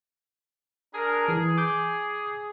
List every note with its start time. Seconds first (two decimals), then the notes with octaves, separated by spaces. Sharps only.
0.93 D4 G#4 A#4
1.28 E3 G#4
1.58 D6 G6